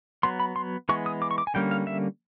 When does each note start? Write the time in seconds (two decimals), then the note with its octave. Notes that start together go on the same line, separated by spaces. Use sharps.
0.23 F#3 B3 C6
0.40 B5
0.56 C6
0.89 E3 G#3 B3 C#6
1.06 D#6
1.22 D6
1.31 C#6
1.38 D6
1.47 G#5
1.54 D3 G3 A#3 C#4 G5
1.71 F5
1.87 E5